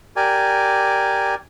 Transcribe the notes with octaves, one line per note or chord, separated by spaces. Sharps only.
G4 A#4 D5 G#5